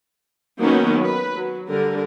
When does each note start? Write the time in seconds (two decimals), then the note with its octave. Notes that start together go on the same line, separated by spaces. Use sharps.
0.59 D#3 F#3 A#3 B3 C#4 D#4
1.01 B4
1.35 F#3
1.70 D3 G3 A#4